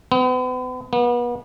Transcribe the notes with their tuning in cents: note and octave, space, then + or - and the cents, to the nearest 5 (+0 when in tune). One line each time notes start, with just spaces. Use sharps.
B3 +40
B3 -35